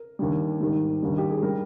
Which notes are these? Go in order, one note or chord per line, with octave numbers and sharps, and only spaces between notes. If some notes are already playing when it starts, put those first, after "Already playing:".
Already playing: A#4
D#2 D3 G3
G#2 D#3 G3
D#2 D3 G3
G4
G#4
G3 A#4